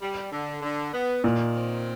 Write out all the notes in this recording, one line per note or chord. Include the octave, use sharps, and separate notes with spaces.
G3
D3
D3
B3
A#2 D#3
C4